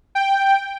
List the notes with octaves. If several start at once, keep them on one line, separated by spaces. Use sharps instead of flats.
G5